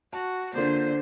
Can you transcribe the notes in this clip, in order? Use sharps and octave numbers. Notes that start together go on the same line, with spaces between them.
F#4 A5
D3 A#3 F4 C5